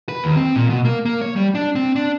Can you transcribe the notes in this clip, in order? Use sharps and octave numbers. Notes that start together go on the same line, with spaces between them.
B4
D#2
C4
A#2
B2
A#3
A#3
C#5
G3
D4
C4
D4